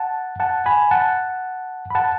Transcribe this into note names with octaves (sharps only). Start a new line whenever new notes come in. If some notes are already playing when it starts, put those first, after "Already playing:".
Already playing: F#5 A5
F#5 A5
G#5 B5
F#5 A5
B5
F#5 A5